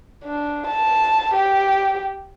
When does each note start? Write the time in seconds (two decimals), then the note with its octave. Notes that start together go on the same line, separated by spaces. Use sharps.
0.24 D4
0.67 A5
1.34 G4